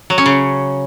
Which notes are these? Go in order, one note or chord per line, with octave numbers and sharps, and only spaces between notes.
F#3
C#4
C#3